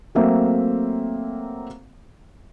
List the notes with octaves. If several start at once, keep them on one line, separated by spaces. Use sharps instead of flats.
F#3 A3 A#3 C4 E5 F5